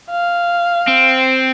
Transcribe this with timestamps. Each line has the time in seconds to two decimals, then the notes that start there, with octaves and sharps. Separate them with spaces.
0.11 F5
0.87 C4